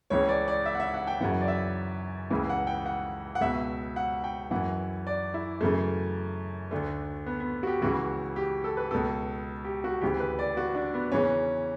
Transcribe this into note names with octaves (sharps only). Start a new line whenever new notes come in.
C#2 C#3 E3 C#5
D5
D5
E5
F#5
E5
F#5
G5
F#2 C#3 E3 F#5
D5
E5
C#2 C#3 E3
F#5
G5
F#5
F#5
C#2 B2 E5
F#5
G5
F#2 E3 F#5
D5
E4
F#2 C#3 E3 A3
D2 D3 A3
B3
B3
F#4
G4
C#2 C#3 E3 F#4
G4
A4
B4
C#2 B2 A4
G4
F#4
D2 C#3 E3 G4
B4
D5
F#4
D4
B3
E2 C#3 E3 C#4